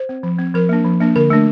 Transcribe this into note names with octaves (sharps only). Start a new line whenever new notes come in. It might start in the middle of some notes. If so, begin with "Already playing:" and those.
Already playing: C5
C4
F3
C4
F3 A#4
A#3 D4
F3
A#3 D4
D3 A#4
A3 D4